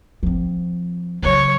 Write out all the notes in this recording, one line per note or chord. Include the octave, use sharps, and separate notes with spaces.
F3 C4
C#3 F#3 C#5